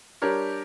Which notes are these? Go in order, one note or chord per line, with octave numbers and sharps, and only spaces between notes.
G3 D4 G4 A#4 C#5